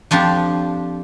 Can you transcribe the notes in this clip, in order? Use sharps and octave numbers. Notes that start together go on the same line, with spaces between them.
F2 F3 D4 G4